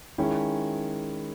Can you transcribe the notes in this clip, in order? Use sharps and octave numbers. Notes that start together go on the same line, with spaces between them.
D#3 G#3 C#4 E4